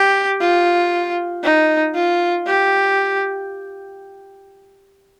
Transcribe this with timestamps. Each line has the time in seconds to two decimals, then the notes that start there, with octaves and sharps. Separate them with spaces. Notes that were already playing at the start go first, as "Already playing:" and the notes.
Already playing: G4
0.41 F4
1.44 D#4
1.95 F4
2.47 G4